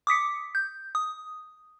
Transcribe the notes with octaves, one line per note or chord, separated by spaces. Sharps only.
D6 D#6 B6 C#7
G6
D#6